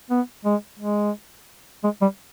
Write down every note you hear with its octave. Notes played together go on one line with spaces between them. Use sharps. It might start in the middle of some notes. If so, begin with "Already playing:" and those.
B3
G#3
G#3
G#3
G3